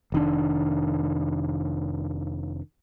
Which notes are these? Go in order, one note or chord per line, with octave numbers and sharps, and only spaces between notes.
F1 D#3 D4